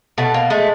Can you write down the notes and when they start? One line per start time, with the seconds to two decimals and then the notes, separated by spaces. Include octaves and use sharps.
0.18 B2 A3
0.34 A#3
0.50 G#3 A3